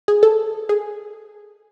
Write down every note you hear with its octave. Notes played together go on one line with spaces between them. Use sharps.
G#4
A4
G#4